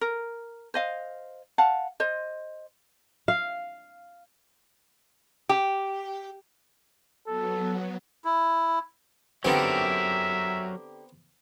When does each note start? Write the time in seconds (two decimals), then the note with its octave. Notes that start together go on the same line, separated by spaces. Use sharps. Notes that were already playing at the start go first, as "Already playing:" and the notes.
0.01 A#4
0.74 C5 D#5 F5
1.58 F5 F#5 A5
2.00 C5 D#5
3.28 F5
5.49 G4
7.27 F#3 B3 A4
8.25 E4
9.45 D3 F#3 B3 C4 D#4 G4 A#4 E5